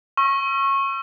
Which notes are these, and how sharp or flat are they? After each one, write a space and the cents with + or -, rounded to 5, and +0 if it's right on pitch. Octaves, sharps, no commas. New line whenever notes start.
C#6 -20 E6 +40